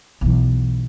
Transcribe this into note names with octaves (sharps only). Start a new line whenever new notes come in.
B1 E3